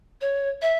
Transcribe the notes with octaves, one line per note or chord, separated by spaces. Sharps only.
C#5
E5